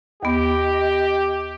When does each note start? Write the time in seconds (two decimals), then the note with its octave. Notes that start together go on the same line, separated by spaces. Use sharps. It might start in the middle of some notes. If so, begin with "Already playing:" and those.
0.23 D#2 B3 G4 D#5